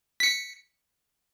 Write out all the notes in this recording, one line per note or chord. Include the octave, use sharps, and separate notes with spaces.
B6 C#7